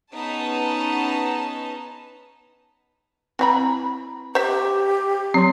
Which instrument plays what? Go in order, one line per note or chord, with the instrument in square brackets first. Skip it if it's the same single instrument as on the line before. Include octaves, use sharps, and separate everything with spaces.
[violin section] B3 C#4 D#4 G#4 A5
[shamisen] E3 G#4 B5 [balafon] C4 A#5
[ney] G4 [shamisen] C5 E5
[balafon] F#3 C#5 C6 [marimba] C4